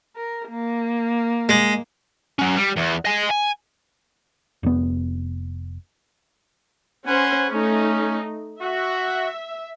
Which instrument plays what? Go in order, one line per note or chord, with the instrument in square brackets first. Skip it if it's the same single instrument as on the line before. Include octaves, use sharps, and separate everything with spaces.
[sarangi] A#4
A#3
[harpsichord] G#3
[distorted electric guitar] F#3 C#4
G3
E2
D#5 G#5
G#5
[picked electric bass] F1 B3
[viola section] C#4 C5 [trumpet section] B4 F#5 G#5
[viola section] A3 D#4 [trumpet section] C#4
[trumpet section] F#4 [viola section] E5